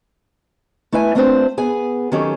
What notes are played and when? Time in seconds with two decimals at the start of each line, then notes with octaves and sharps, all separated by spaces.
0.92 A3 E4 B4 E5 G#5
1.15 A3 C4 D4 F4 B4 C5
1.58 B3 G#4 G#5
2.12 D#3 F#3 C#4 G4 A4